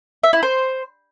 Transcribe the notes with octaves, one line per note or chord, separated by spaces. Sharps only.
E5
E4
C5